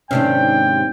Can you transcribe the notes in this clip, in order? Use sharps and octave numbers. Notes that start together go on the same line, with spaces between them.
D#2 G#2 C3 C#4 D4 G5